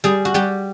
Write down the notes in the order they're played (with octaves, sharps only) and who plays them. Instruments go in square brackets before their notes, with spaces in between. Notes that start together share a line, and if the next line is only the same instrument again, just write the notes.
[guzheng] G3 G#4
F#4
G3 G4